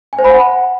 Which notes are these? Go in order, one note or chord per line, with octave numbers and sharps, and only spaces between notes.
G#5
C5
B5
F#5